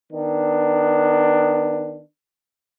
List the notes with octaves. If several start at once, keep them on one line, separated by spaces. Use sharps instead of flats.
D#3 B3 D4